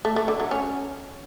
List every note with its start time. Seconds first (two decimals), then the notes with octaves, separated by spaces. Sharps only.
0.05 A3
0.16 A3
0.28 D3
0.40 F#3
0.51 C#4